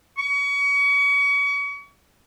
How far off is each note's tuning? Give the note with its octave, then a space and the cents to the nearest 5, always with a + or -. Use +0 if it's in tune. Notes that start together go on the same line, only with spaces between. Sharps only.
C#6 +35